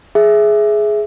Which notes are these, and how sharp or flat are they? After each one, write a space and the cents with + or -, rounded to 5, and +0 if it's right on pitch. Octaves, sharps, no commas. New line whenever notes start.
G#4 +15 E5 +0